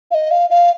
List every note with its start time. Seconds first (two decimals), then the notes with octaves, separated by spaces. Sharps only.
0.11 F5
0.14 D#5
0.31 F5
0.50 F5